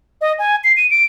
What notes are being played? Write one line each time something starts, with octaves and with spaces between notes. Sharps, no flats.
D#5
G#5
C7
D#7
D7